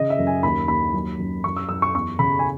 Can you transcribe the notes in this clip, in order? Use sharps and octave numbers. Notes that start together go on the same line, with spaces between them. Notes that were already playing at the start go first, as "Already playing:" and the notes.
Already playing: C#3 D#5
E5
F#2
G#5
D#2 B5
D#2 B5
F#3
F#2
F#2 C#6
E6
F#2 E6
C#6
E2 C#6
C#3 B5
G#5